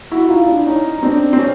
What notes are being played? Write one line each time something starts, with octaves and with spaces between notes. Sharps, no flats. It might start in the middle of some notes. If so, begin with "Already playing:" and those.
E4 F#4
D#4 F4
D4 E4
C#4 D#4
D#4
C4 D4
C4
C#4